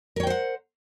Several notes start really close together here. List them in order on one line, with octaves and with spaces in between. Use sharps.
A#4 C#5 G5 C5 F#5